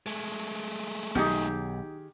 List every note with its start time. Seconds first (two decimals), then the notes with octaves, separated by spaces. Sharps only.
0.06 G#3 A3
1.15 B1 D#3 C#4 D#4 G4 G#4